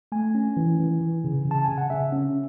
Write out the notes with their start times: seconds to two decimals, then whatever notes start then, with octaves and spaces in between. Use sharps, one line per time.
0.12 A3 G#5
0.35 C#4
0.57 E3
0.80 E3
1.01 E3
1.24 C#3
1.46 C#3
1.51 A5
1.64 C#3 G#5
1.78 F#5
1.90 C#3 E5
2.12 C#4